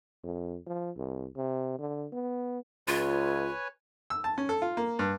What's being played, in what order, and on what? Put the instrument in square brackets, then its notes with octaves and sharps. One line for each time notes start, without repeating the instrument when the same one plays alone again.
[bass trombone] F2
F3
C2
C3
D3
B3
[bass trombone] C#2 [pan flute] F4 [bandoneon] B4 C#5 G#5
[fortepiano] E6
A5
C#4
A4
F4
A#3
G2